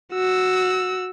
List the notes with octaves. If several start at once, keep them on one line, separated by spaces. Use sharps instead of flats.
F#4 E6